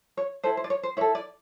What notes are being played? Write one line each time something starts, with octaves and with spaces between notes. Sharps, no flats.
C#5
E4 A4 C5
C5
D5
C#5
C5
E4 A4 C#5
D5